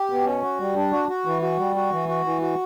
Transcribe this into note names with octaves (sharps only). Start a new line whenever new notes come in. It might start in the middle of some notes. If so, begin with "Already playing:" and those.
Already playing: G4
B2
C#4
F#4
G3
D4
F#4
F#4
E3
F#4
G3
F#4
E3
F#4
E3
F#4